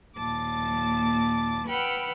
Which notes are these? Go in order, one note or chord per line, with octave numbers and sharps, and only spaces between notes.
D#2 A#2 A5 D6
B4 F#5 G5 B5 E6 F6